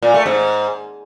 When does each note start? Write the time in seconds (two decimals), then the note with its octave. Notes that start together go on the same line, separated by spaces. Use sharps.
0.02 A#2
0.14 A3
0.26 G#2